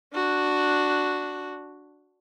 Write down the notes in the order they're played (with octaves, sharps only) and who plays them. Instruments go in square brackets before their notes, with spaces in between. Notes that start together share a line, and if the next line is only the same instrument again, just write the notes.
[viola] D4 F#4